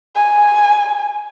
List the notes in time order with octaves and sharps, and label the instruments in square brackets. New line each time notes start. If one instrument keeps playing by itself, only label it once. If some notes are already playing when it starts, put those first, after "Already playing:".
[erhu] G#5